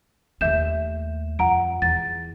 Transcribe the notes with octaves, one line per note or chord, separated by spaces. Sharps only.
D#2 A3 E5 G6 E7
F2 F#5 A#5 D7
E2 A6